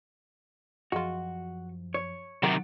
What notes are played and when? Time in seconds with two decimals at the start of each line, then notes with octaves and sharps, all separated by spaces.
0.92 F#2 F3 G#3 F4 F#4
1.94 C#5
2.43 C3 D#3 F#3 F#4 G4 A#4 F#5 A6